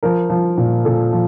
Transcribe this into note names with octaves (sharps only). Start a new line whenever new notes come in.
F3 A#4
F3
A#2
A#2 A4
F3